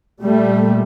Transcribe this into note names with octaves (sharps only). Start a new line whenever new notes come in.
A#2 G3 A3